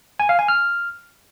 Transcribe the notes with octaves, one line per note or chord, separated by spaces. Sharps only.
G#5
F5
G#5
F6